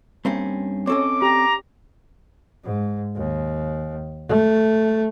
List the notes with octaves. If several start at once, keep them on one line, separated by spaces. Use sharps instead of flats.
G2 A#3 C4 C#4
C4 C#4 A4 C#5 D#5 D6
G4 A#5
G#2
D#2
A3